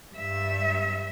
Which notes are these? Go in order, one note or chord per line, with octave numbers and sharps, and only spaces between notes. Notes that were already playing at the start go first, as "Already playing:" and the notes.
G2 E5